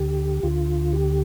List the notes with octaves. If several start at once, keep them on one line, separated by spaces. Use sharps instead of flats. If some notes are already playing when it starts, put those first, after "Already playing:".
Already playing: D2 D3 G4
D2 D3 F4
G4